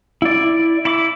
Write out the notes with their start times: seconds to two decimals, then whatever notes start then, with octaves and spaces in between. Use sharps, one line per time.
0.22 E4 D5
0.85 E4 B5 D6